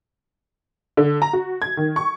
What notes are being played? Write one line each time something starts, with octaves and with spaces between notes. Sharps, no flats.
D3
A#5
F#4
G#6
D#3
C#6